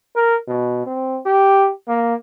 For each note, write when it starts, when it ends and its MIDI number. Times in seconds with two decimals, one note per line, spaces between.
0.16 0.36 70
0.48 0.86 47
0.87 1.19 60
1.26 1.70 67
1.88 2.15 58